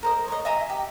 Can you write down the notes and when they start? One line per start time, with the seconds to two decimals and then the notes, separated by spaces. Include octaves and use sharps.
0.03 A#4 C5 D#5
0.28 C#5 D#5
0.45 D#5 E5 G#5 A#5
0.70 G4